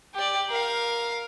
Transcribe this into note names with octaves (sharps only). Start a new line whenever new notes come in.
G4 D5
A#4 F5